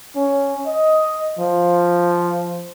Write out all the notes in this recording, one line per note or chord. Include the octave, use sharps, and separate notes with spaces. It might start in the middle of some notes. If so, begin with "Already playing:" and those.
C#4
D#5
F3